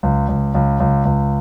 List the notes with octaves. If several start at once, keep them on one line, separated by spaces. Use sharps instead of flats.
C#2
C#2
C#2
C#2
C#2